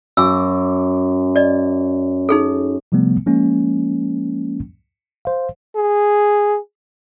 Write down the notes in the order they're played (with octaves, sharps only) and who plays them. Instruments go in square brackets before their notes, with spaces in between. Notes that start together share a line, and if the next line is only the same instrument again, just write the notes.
[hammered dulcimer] F#2 D6 [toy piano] E6
[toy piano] D5 D#5
D#4 G#4 A4
[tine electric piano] C3 F3 G3 A3 B3
F3 G#3 A#3 C#4
C5 F5
[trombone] G#4